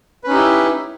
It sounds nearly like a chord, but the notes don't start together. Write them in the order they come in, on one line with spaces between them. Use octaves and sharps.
B4 C#4 D#4 G4 E4